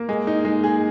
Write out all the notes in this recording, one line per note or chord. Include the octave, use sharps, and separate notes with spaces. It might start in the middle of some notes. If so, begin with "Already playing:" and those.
Already playing: A#3
G#3
D#4
G#3
G#4